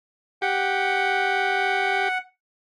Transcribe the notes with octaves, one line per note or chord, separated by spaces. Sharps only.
G4 F#5